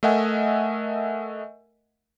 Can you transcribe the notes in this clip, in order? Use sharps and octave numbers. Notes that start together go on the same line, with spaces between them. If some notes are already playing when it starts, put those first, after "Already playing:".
A3 A#4 D#5 E5 F#5 G#5